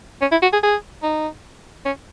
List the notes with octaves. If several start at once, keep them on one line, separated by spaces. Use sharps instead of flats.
C#4
E4
F#4
G#4
G#4
D#4
C#4